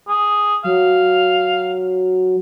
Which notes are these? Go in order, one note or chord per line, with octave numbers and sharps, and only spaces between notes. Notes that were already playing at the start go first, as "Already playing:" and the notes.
G#4
F#3 F5